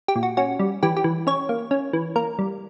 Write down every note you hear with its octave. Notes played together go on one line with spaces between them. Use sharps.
G4
A#2
F#4
C#4 F#4
G3
E3 G4
G4
E3
C#4 C#5
A#3
C#4
E3
A#3 A#4
G3